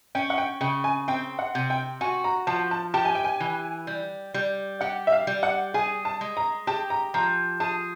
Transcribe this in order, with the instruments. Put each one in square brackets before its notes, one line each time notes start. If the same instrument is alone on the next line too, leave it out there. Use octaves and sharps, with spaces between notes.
[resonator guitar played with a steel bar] C#4 [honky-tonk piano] G5
[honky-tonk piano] F#5
G5
[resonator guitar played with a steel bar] C#3 [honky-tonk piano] G5
[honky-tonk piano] G#5
[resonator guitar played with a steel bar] C4 [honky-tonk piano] G5
[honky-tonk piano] F#5
[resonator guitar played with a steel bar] C3
[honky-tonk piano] G5
[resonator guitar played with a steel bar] F#4 [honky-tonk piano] G#5
[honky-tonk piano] A#5
[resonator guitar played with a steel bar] F3 [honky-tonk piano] A5
[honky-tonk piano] A5
[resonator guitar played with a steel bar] G4 [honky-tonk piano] A5
[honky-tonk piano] G#5
G5
G#5
[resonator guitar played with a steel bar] E3
G3
G3
[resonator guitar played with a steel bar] G4 [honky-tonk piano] F#5
[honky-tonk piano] E5
F5
[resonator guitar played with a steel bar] G3
[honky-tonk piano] F#5
[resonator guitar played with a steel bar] G#4 [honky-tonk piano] G#5
[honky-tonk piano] A5
[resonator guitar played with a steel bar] G#3
[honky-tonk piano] A#5
[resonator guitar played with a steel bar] G4 [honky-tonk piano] A5
[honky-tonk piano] A#5
[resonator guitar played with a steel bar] F3 [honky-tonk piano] A#5
[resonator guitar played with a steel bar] G#4 [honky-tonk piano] A5